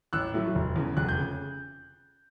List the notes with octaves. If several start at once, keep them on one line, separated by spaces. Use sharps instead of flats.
A1 E6 F#6
A2 F#3 A3
F1
E2 C#3
F1 F#6
G6
C#3